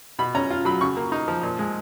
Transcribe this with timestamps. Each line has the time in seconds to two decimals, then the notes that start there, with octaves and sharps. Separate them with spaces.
0.19 B2 B5
0.35 C#4 A#5
0.50 F4
0.65 F#3 B5
0.81 C#3 C#6
0.97 A#3
1.12 D#4
1.28 F3
1.43 A#2
1.59 G#3